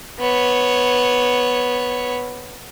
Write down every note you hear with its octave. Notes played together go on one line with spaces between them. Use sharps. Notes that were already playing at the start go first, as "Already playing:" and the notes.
B3 C#5